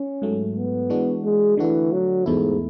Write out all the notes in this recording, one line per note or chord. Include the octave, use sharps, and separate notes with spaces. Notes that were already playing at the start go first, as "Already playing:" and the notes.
Already playing: C#4
G#2 F#3 A3
B3
E3 G#3 D4 F#4
G#3
D3 E3 A3 D4 F#4
F#3
E2 G#2 B2 A3 E4